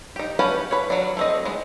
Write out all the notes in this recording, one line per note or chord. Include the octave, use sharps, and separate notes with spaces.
D#4 G4
C#4 G4 B4 F#5 A5
B4 C#5
F#3 D4
A3 C4 D#5
G#3 B3